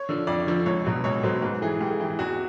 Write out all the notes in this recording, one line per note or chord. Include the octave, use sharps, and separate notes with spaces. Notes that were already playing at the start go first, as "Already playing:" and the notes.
Already playing: C#5
D3 F3
F2 D5
D3 F3
C#2 C#5
B2 F#3
C#2 C#5
B2 F#3 C5
G#2 B4
E3 G#4
G#2 G4
G#4
E3 G4
E2 F#4